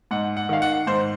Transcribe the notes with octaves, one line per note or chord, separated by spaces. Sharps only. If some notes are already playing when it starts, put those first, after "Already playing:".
G#2 F#5
F#5
D#3 F5
F#5
G#2 C5